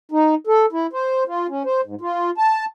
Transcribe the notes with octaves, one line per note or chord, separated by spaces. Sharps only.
D#4
A4
E4
C5
F4
C#4
C5
G#2
F4
A5